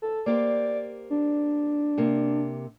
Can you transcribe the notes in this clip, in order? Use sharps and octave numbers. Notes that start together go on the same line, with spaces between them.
A4
A#3 G4 C5 D5
D4
C3 A#3